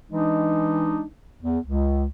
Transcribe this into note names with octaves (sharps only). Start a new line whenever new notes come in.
E3 G#3 D4 D#4
E2
C#2